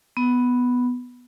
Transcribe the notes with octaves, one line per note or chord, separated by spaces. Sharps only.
B3